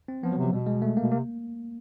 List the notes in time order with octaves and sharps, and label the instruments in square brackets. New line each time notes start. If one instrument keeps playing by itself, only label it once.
[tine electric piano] C4
[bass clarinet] F3 [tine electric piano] B3
[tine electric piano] F#3
[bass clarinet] C3
[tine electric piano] F3
[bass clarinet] B2 [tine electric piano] G3
[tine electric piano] G#3
A3
A#3
[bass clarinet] B2
[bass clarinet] C3 [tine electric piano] A#3